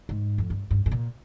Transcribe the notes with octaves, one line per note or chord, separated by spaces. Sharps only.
G#2
F2
G2
G2
G#2
A#2